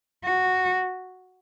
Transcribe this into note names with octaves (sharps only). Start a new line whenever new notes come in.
F#4